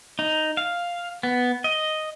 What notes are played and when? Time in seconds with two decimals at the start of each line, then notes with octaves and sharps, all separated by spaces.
0.19 D#4
0.57 F5
1.23 B3
1.64 D#5